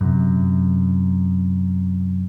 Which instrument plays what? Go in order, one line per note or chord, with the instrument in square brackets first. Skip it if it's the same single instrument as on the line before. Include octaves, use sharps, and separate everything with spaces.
[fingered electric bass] F#2 C3